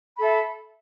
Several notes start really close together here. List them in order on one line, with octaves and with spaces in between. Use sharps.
B5 A4 E5